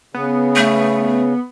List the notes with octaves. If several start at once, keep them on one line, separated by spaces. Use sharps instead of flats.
C#3 B3
A3